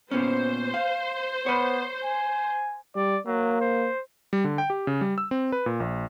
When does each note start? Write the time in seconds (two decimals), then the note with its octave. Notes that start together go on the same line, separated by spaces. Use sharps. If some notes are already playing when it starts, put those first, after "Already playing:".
0.11 A#2 B3 C#4 C5
0.74 F5
1.46 B3 C#5 B5
2.04 G#5
2.96 G3 D5
3.26 F#3 A#3
3.61 C5
4.33 G3
4.44 D3
4.58 G5
4.70 G4
4.87 C#3
5.01 G3
5.18 E6
5.31 C4
5.52 B4
5.66 A#2
5.80 A#1